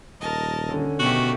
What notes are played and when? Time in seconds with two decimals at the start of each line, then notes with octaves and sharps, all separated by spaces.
0.20 D#1 A#4 D#5 A5
0.68 D3 C#4
0.99 B2 D#3 A3 F#4 G4